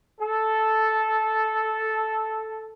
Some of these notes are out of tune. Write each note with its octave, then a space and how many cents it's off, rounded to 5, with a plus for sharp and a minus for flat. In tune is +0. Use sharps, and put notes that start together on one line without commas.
A4 -5